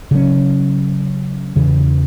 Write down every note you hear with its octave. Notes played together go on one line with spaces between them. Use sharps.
C#3 F#3 C#4
E2 C#3 E3